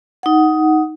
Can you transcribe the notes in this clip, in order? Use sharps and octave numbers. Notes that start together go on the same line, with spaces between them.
D#4 F#5